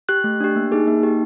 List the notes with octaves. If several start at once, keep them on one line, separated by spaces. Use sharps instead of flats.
G4 F#6
A3
D4 G4
A#3
D#4 G#4
A#3
D#4 G4